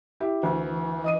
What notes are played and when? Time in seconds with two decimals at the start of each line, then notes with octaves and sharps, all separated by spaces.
0.20 E4 G4 E5
0.43 D2 E3
1.04 D#5 D#6 D#7